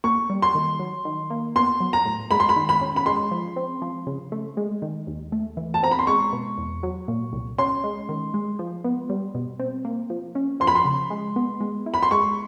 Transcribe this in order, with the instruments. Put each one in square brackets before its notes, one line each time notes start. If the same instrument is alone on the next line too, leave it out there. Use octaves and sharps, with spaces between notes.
[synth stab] A#3 [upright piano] C#6
[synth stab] G3
[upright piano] C6
[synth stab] D#3
F#3
D#3
A#3
[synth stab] B3 [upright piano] C6
[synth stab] F#3
[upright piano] A#5
[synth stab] A2
[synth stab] G#3 [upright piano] B5
[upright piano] C6
B5
[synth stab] D#3
[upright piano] B5
[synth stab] C#4
[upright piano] B5
[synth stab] G#3 [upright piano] C6
[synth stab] F3
C4
F3
C#3
A3
G#3
D#3
D#2
A3
E3
[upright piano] A5
[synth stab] C4 [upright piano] A#5
[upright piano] B5
C6
[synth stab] G#3 [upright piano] C#6
[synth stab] B2
E2
F#3
A#2
C2
[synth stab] C#4 [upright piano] C6
[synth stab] G#3
D#3
G#3
F3
B3
G3
B2
C4
A#3
F3
C#4
[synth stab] F3 [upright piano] C6
[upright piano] B5
C6
[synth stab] C#3
G#3
B3
G#3
E4
[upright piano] B5
C6
[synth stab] G#3 [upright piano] C#6